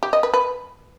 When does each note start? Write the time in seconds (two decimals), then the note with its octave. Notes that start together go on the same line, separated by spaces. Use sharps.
0.03 G4
0.13 D#5
0.23 B4
0.34 B4